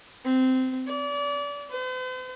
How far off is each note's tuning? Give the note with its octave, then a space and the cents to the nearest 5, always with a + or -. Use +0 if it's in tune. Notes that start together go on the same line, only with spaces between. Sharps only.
C4 -15
D5 -35
C5 -45